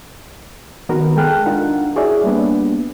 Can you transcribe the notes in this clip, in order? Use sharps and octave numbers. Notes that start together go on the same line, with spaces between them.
D#3 B3 F#4 A#4 B4
G#3 A4 G5 F6 F#6
D4 D#4 F4 A#4 F#5
E4 F#4 G#4 C#5 D5 E5
G3 A#3 B3 D4